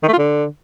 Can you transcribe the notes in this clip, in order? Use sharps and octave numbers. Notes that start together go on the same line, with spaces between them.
D#3
A3
F4
D3